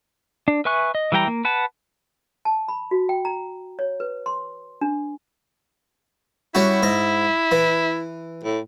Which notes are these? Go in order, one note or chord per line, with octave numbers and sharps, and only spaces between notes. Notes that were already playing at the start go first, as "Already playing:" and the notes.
D4
B4 E5 G#5 C#6 F#6
D#5
E3 G3 F#5 G5 A#5
A#3
B4 F#5 A5
A5
B5
F#4
G5
A#5
C#5
B4
C6
D4
G3 C#4 E4 F#4
G#2 D#5
E3
A2